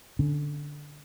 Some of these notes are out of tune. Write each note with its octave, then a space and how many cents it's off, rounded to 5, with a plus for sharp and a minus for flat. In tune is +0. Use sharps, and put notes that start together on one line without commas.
D3 +0 C#4 +0